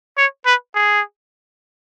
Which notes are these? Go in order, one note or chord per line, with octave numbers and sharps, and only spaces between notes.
C#5
B4
G#4